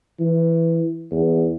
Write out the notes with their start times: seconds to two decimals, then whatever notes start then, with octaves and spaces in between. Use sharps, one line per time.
0.20 E3
1.11 E2